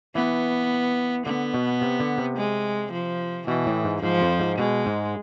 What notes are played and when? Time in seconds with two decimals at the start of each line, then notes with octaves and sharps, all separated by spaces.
0.15 E3 B3
1.26 D3 B3
1.54 B2
1.81 C3
2.00 D3
2.18 C3
2.37 G#3
2.92 F3
3.47 B2 E3
3.66 A2
3.84 G#2
4.02 G#2 F3
4.21 F2
4.40 G#2
4.58 B2 G#3
4.86 G#2